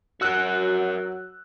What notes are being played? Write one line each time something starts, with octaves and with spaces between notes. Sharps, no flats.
F#3 F#4 A#4 F#5 E6 F#6